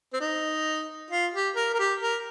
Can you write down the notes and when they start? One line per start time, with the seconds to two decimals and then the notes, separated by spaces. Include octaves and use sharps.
0.13 C4
0.21 D#4
1.11 F4
1.34 G4
1.56 A#4
1.74 A#4
1.79 G4
2.02 A#4